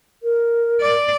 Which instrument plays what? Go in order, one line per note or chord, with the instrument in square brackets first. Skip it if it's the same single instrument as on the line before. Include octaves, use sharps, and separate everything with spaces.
[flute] A#4
[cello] D5